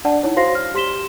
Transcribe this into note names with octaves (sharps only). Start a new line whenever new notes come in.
D4 D5 F#5 A5
D#4 E4 C#5
F#4 C5 F5 C6 A#6 C7
F6
G4 C6 B6 E7 G7